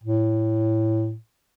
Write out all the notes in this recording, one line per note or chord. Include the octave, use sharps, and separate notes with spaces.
A2